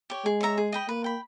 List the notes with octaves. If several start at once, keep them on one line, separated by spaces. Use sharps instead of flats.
G4 C#5
G#3 G#4
C#5 E5 A#5
G#4
D#5 G5 B5
A#3 B4
G5 B5